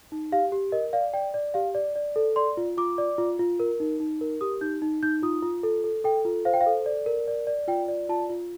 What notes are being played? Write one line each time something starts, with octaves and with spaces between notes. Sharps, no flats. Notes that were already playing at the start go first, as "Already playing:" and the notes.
D#4
G4 F5
G4
A#4 D#5
D5 F5
D5 G5
D5
G4 F5
D5
D5
A4
D5 C6
F4
F4 D6
D5
F4
F4
A#4
D#4
D#4
A#4
G4 D#6
D#4 G6
D#4
D#4 G6
F4 D#6
F4
A4
A4
A4 G5
F4
C5 F5
G5
F5
A4
D5
A#4
D5
D5
F4 G5
D5
F4 A5
F4